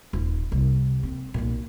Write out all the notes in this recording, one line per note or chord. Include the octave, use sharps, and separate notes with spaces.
D#1
C2
C4
B1 A#2